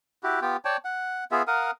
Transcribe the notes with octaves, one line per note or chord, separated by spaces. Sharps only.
E4 F#4 G4
B3 F4 G4 G5
C#5 D5 G5 A5
F#5
B3 F4 G#4 E5
A#4 F5 F#5 D#6